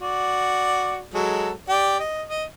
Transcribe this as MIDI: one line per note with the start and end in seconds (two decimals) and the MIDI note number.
0.01 1.05 66
0.01 1.05 74
1.14 1.51 54
1.14 1.51 56
1.14 1.51 69
1.69 1.98 67
1.69 1.98 74
2.00 2.23 75
2.29 2.45 75